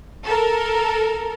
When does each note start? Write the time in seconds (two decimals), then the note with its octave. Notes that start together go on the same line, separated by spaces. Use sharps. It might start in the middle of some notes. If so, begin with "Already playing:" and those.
0.25 A4 A#4